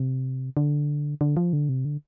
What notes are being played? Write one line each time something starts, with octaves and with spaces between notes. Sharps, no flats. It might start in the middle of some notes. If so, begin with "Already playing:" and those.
Already playing: C3
D3
D3
F3
D3
C3
D3